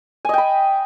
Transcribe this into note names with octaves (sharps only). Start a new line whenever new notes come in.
D#5 G5 G#5 B5